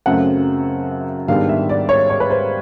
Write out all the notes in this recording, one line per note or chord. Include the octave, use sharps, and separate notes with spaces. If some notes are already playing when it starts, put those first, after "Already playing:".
F#2 C#3 F#3 A3 C4 F#5
G#2 D#3 G3 B3 D4 F5
E5
D5
C#5
C#5
B4
C5